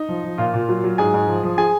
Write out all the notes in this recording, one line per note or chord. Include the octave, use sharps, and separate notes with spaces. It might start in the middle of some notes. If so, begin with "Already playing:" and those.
Already playing: D#4
F3
F3
A#2 F4 F5
A#2
F#3
F#3
G#2 G#4 G#5
G#2
F3
F3
G#4 G#5